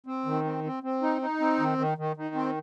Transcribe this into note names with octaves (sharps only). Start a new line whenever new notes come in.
C4
D#3
C4
C4
C4
D#4
D#4
C4
D#3
D#3
D#3
D#3
C4